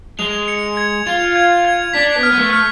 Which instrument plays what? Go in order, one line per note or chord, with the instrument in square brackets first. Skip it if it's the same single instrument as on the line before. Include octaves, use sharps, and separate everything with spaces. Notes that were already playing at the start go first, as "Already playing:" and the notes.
[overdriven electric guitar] G#3 [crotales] F7
[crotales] C#7
G#6
[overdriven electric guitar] F4 [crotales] F7
[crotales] G#6
G#6
[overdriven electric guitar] D4 [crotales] B6
[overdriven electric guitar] B3
[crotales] F6
[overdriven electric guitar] B3
A3
[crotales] F6